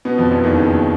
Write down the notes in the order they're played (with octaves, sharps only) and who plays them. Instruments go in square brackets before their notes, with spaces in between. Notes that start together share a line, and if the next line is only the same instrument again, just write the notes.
[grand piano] B2 B3
F2 F3
E2 E3
D#2 D#3
C#3